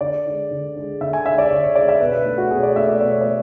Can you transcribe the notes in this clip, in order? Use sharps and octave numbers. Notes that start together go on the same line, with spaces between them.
D3 D5
G#3 D4
D3
G#3 D4
D3 E5
G#5
G#3 D4 E5
D5
D3 C#5
C#5
G#3 D4 D5
E5
B2 B4
B4
A3 D4
F#4
B2 G#4
C#5
D5
A3 D4 E5
D5
B2 D5
C#5
A3 D5